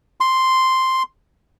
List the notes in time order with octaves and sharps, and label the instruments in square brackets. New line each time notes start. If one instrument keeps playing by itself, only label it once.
[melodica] C6